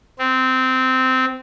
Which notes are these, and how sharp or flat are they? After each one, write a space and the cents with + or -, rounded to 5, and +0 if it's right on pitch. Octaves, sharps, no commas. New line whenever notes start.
C4 -15